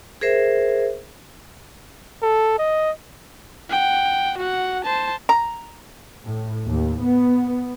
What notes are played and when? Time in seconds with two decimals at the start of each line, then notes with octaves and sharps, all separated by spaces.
0.21 G#4 A#4 C5 E5
2.22 A4
2.59 D#5
3.70 F#5 G5
4.38 F#4 F#5
4.84 C5 A5
5.29 A#5
6.24 A2
6.67 D#2
7.02 B3